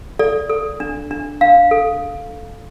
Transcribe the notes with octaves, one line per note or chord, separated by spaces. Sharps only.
A4 D5
A4
D4
D4
D4 F5
A4